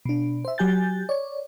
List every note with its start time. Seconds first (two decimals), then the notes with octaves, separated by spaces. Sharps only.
0.05 B2 D4
0.45 C5 E5
0.58 F#3 G4 G#5 G6 A6
1.09 C#5 D5